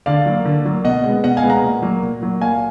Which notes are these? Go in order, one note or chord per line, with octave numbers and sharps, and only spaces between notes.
D3 D5 F5
F#3 A#3
D3
F#3 A#3
B2 D#5 F#5
G#3 B3
B2 D#5 F#5
F5 G#5
G#3 B3
F#5 A#5
A#2
F#3 A#3
A#2
F#3 A#3
A#2 F5 G#5